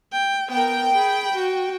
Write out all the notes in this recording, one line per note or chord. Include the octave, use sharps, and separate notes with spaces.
G5
B3 A#4 G5
G#4 B5
F#4